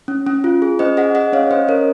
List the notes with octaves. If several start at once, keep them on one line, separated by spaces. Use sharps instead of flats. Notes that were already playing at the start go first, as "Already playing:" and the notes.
C#4
C#4
F4
G#4
C#4 C5 D#5
G#4 D#5 F#5
G#4 D#5 F#5
C#4 C#5 F5
C#4 C5 D#5
C#4 A#4 C#5